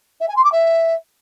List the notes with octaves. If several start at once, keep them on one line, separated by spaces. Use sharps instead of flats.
E5
G#5
C6
D6
E5